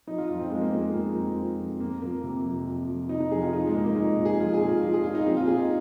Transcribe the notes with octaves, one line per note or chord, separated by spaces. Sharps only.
F3 D#4
F4
F2 F4
C4
F3 G#3
A#3
F2 A#3
G#3
F3 A#3
F2 C4
F3
F2
F2 A#3
F3 A#3
C3
F2
F2
F3
C3 D#4
D#4
F2 G#4
F4
F3 D#4
G#3
A#2 A#3
A#3
F3 D#4
A#2
G#4
F3 F4
G#4
A#2
F4
F3 F4
G#4
A#2 F4
D#4
F3 C4
F4
A#2 G#4
D#4